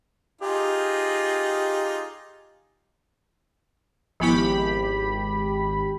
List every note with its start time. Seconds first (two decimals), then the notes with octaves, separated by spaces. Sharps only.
0.41 D#4 F4 G4 G#4
4.20 G#1 F3 B3 E4 G4 B5